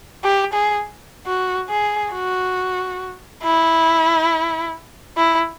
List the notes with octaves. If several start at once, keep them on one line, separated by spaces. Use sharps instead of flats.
G4
G#4
F#4
G#4
F#4
E4
E4